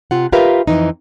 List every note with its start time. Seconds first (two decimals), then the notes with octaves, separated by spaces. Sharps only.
0.11 C3 F4 F#5
0.32 F4 G4 A#4 B4 E5 F5
0.68 F2 E3 D#4